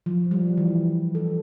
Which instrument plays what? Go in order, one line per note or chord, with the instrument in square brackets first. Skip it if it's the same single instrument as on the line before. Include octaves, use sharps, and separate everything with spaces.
[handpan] F3
G3
E3
A4